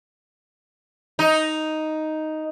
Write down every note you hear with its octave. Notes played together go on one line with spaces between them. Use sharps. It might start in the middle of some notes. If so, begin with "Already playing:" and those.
D#4